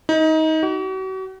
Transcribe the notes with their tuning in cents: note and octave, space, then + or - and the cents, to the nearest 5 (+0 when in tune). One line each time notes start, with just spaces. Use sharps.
D#4 +25
F#4 +40